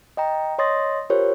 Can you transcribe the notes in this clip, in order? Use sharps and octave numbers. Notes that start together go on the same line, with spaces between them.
D#5 G5 A#5
C#5 D#5 C6 D#6 A6 A#6
F4 G4 A#4 C5 C#5